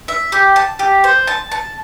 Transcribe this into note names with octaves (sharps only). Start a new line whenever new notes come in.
E5
G4
A5
G4
C5
A5
A5